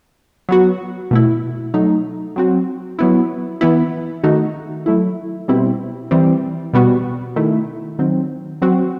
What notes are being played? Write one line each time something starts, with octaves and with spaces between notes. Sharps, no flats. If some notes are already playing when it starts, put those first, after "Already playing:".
F#3 B3 F#4
B2 A3 E4
F#3 A3 D#4
F#3 C4 F#4
F#3 B3 E4
E3 B3 E4
D#3 A3 D#4 F#4
F#3 A3 E4
B2 G3 C4 E4
E3 G3 C4
B2 G3 B3 F#4
D#3 A3 E4
D#3 F#3 C4
F#3 C4 F#4